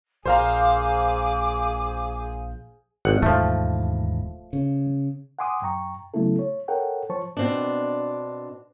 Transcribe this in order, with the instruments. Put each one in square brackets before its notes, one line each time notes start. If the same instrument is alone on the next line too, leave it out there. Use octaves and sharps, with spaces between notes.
[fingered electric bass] A#1 [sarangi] G#4 [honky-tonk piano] C5 F5 A#5 [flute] D6
[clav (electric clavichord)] G#1 F#5
[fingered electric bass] E1 D#2 G#2 [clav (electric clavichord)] F3 A3
[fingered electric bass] C#3
[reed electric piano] F#5 G#5 C6 D6 D#6
F#2 G5 A#5 C#6
C#3 F#3 A3 B3 E4 A4
C#5
A4 A#4 C#5 F#5 G5
F3 C5 C#5 A5 C#6
[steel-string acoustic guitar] B2 C4 D4